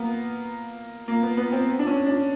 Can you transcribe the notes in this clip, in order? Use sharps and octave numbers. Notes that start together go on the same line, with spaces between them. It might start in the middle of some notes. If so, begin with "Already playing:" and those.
Already playing: A#3 B3
A#3
B3
B3
C4
D4
C#4
D4